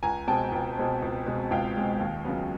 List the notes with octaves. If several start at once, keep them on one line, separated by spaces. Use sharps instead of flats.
C#2 G#5 A#5
B2 G#3 C4 G5 A5
C#2
B2 G#3 C4
C#2
B2 G#3 C4
C#2 F5 G5
B2 G#3 C4
D#2
C#3 F#3 B3